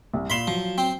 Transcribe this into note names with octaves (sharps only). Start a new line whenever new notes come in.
C2
A#2 B5 C6 E7
F3 F#3
C4